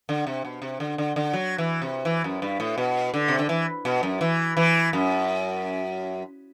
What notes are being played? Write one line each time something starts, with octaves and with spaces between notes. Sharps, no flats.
D3
C3
B2
C3
D3
D3
D3
F#3
E3
C3
E3
F#2
G2
A2
B2
D3
C3
D3
E3
B2
F#2
E3
E3
F#2